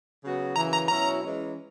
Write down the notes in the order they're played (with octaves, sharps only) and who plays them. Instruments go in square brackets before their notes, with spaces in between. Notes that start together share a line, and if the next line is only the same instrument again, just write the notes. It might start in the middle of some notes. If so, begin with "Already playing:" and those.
[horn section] C#3 F#3 B3 F#4
[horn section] F#2 C#3 E3 [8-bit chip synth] A#5
[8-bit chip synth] A#5
[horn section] B2 F#3 C#4 E4 [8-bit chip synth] A#5
[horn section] E3 G#3 C#4